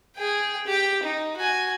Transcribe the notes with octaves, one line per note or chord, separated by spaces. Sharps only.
G#4 G5
G4 G5
D#4
F#4 G#5